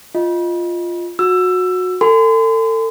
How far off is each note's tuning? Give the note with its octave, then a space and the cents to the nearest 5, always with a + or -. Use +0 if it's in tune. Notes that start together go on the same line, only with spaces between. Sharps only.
F4 +0 D#5 +0
F#4 -20 E6 +20
A4 +35 G#5 +0 C6 -40